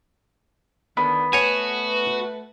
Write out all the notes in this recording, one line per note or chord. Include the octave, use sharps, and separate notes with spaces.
D3 D#3 B3
A3 F#4 B4 C#5 G#5